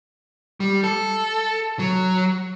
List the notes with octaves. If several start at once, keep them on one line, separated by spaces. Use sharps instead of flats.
G3
A4
F#3